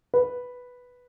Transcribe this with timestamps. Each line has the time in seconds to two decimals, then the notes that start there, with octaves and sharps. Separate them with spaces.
0.14 B4